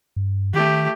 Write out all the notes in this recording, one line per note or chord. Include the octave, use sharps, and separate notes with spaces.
G2
D#3 A3 G4